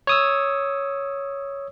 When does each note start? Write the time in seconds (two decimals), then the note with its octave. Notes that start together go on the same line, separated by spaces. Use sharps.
0.07 C#5 D#6 E6